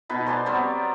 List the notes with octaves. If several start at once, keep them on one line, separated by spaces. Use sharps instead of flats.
B2 D#4 B4
C5 D5 G#5 A5
F#3 G3 B3 C4